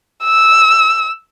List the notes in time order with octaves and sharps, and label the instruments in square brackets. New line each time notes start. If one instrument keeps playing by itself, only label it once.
[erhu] E6